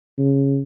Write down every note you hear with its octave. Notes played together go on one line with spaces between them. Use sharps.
C#3